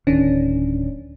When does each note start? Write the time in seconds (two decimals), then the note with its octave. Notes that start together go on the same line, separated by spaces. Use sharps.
0.07 D1 D#3 C#4 D4